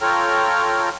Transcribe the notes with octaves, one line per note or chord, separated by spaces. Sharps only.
F4 A4 C#5 G5 A#5 F6